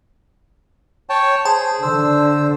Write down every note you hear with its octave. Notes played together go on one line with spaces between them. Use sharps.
C#5 G5 A5
G#4 C5 A5
D3 C5 E6